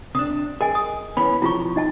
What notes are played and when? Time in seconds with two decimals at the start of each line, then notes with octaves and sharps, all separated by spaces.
0.15 C3 D4 D#6
0.61 G#4 A#4 D#5 G#5
0.75 D#6
1.17 E3 B3 C#4 B5
1.42 B1 C3 F3 E4 F4 C#6
1.76 D#4 D#5 A5